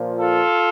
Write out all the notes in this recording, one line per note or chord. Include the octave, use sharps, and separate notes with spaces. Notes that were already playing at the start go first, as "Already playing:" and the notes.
Already playing: A#2 F3
F4 A4